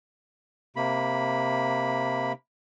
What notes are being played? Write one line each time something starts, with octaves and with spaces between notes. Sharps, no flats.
C3 A#3 B5